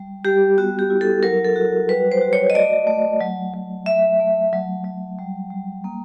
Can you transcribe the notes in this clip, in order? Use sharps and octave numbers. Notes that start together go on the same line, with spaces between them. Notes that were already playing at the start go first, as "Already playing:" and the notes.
Already playing: G3
G3 G4
B3 F#4
G4
E4
A4
F#3 A#4
A4
F#4
G3 B4
C5
F#4
C#5
D#5
A3 D5
A3
F#3
F#3
A3 E5
A3
F#3
F#3
G3
G3
A#3